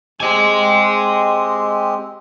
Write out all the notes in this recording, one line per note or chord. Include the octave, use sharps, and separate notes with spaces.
G#3 C4 G4 D#5 G#5